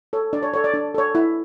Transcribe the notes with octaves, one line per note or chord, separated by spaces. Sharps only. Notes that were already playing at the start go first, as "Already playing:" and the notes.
A4 C#5
D4 D5
C#5
A4 C#5 D5
D5
D4
A4 C#5
E4